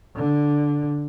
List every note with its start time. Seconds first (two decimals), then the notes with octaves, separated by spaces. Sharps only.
0.16 D3